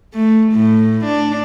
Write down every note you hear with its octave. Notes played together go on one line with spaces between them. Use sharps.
A3
A2
D4